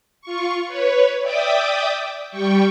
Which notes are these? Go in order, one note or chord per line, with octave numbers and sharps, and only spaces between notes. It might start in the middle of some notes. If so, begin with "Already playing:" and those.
F4 C#6
B4 C#5
D5 E5 G5 D6 D#6
G3 G5 C#6